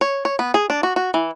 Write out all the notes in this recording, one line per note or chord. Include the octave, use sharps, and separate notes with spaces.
C#5
C#5
B3
G#4
D4
F#4
F#4
E3